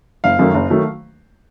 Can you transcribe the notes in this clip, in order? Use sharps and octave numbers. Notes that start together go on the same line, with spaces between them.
F#1 F5
F#2 D#3 F#3 A3
F#1
D#3 F#3 A3